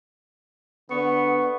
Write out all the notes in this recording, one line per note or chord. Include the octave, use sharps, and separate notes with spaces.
D3 B3 C#6